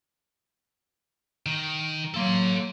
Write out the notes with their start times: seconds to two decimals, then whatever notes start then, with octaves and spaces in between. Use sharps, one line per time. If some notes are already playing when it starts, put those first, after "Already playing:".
1.46 D#3
2.14 F#3 A#3 A4 C6